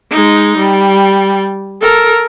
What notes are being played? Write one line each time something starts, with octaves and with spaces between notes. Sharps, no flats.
G#3 D#4
G3
A4 A#4